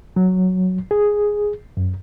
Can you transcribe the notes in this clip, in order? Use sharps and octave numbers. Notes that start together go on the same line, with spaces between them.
F#3
G#4
F#2